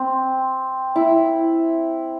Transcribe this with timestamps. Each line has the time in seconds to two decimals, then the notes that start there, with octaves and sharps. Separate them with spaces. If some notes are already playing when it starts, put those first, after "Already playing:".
Already playing: C4
0.96 E4